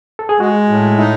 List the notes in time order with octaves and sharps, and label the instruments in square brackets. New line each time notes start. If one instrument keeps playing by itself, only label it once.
[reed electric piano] A4
G#4
[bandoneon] G#3 [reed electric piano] F#4
[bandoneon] A2
[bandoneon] D#4 [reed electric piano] E4